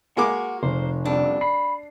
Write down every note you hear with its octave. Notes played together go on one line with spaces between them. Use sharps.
G#3 A#3 F#4 D6
F1 C5
D3 G3 C4 D4
B5 C7